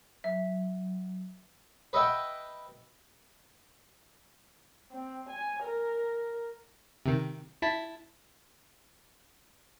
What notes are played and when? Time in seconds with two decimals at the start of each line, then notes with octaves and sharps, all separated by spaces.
0.24 F#3 E5
1.93 B4 D#5 E5 F#5 G5
4.92 C4
5.29 G#5
5.63 A#4
7.06 C3 D#3
7.62 E4 A5 B6